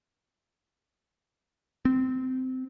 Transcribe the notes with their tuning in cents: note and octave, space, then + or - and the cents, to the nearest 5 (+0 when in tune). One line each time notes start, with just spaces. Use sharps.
C4 -20